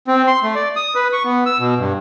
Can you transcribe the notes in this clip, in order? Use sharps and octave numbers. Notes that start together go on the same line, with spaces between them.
C4
C6
A3
D5
D#6
B4
C#6
B3
E6
B2
G2